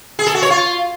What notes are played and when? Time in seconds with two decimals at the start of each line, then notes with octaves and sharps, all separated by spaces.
0.19 G#4
0.27 A4
0.35 F#4
0.42 C#5
0.50 F4